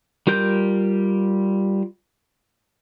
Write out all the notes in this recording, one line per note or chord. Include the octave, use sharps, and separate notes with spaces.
G3 F4 A#4 G6